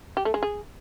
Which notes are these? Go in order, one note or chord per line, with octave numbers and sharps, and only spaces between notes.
G4
A3
G#3
G#4